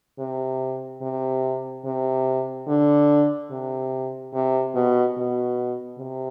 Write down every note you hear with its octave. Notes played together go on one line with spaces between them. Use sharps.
C3
C3
C3
D3
C3
C3
B2
B2
C3